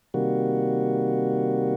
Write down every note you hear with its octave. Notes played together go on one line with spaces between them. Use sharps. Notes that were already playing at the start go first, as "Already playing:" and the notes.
C3 D#3 G3 A#3 F#4